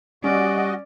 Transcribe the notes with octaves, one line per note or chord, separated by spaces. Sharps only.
G3 C#4 F#4 D5 D#5